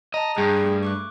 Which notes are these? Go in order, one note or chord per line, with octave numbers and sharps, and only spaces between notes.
D#5 A5 A#5
G2 G#4 G5
A3
C#6 D6 F#6